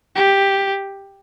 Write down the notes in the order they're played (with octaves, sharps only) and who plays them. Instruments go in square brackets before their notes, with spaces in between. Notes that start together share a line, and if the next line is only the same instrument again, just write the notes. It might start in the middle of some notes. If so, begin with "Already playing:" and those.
[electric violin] G4